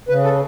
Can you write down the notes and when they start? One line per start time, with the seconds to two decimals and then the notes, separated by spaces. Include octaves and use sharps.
0.09 C#3 B4
0.24 A4